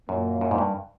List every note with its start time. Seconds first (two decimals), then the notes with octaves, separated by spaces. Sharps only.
0.09 F#2 A#2 F#3 A#3
0.41 F#2
0.51 G#2
0.58 G2